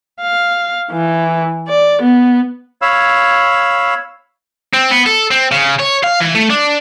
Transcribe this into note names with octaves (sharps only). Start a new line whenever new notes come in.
F5
E3
D5
B3
C#5 F5 B5 E6
C4
B3
A4
C4
C#3
C#5
F5
E3
A3
D4